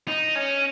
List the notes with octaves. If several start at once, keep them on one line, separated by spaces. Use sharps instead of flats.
D#4
C#4